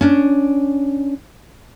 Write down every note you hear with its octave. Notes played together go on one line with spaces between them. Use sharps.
C#4 D4